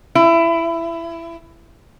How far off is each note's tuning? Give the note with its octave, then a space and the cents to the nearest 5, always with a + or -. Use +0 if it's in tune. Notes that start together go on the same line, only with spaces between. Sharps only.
E4 +20